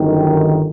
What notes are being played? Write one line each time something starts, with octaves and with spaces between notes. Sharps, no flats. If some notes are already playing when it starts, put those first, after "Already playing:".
Already playing: G1 F#2 D#3